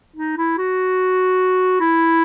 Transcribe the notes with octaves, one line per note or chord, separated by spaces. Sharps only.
D#4
E4
F#4
E4